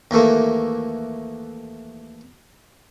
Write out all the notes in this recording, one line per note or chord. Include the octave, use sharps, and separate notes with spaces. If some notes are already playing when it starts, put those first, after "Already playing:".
D#2 E3 A3 A#3